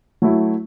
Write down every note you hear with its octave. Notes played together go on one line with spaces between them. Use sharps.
F#3 A3 E4